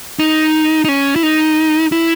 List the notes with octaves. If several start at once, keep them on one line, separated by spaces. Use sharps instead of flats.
D#4
D#4
C#4
E4
D#4
E4